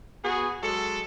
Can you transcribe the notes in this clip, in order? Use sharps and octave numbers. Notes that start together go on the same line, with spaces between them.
B3 F#4 G#4
F#3 G#3 A4